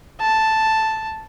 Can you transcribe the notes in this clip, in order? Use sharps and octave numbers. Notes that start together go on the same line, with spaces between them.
A5